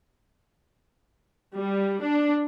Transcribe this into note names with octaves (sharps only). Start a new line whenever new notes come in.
G3
D4